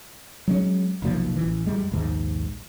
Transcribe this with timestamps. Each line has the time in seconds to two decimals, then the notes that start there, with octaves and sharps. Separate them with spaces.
0.48 F#3 G#3 C#4
1.02 F1 B1 A#2 F3
1.36 A1 E3
1.66 F#2 G3 G#3
1.91 A#1 D#2 G#2